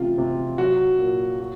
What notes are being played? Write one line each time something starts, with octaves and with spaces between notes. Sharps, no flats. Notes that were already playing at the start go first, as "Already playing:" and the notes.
Already playing: A1 C3 F4
C3
F#3 F#4
A#2
F#4